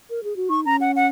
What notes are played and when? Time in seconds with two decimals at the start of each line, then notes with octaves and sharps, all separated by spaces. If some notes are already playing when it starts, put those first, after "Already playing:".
0.10 A#4
0.23 G#4
0.36 F#4
0.49 D#4 C#6
0.65 C#4 A#5
0.81 F#5
0.96 F#5